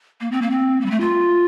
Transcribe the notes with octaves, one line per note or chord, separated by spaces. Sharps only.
A#3
C4
A#3
C4
A#3
G3
A3
F4